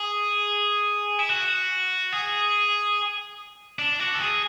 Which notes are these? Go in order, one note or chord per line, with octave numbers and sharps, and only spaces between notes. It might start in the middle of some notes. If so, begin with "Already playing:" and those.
Already playing: G#4
E4
F#4
G#4
D4
F#4
A4
G#4